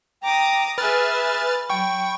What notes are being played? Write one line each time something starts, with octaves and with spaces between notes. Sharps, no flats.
G5 A#5 D6 D#6
G#4 B4 E5 B5 F6 A6
F#3 G5 C#6